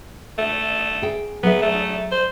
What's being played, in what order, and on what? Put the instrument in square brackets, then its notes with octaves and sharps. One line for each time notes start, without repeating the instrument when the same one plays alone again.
[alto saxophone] A3
[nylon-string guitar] G#4 G5
[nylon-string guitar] F#3 G#4 E5 [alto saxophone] B3
[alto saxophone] A3
C5